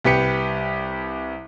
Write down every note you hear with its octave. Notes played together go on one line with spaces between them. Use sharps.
C2 G4 B4 C#7